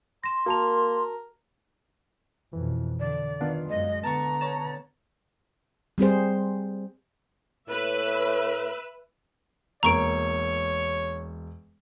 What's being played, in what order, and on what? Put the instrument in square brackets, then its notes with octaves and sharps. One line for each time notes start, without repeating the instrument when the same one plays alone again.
[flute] C6 [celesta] A#6 E7
[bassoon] A#3 [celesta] F#4 A5 F7 [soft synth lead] A#4
[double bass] F2 B2 [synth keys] E3
[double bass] D3 [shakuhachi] D5
[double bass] D#3 [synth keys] B3 D4 F4
[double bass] F#2 G#3 [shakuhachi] D#5
[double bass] D3 B3 [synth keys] A5 C#6 [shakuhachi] A#5
[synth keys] C#5 A5
[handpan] G3 C4 G#4 C5
[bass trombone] A2 [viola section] B4 E5
[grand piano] E1 A#3 [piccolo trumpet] C#5 [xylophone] A#5 C#6 D7